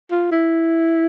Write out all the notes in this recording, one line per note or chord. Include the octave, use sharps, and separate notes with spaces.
F4
E4